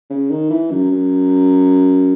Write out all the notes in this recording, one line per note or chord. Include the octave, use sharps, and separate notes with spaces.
C#3
D#3
E3
F#2
F#2